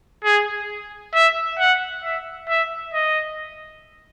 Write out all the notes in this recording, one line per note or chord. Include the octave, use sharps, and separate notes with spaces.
G#4
E5
F#5
E5
E5
D#5